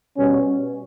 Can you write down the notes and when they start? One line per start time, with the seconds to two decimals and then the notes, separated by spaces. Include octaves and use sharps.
0.17 B2 G3 C#4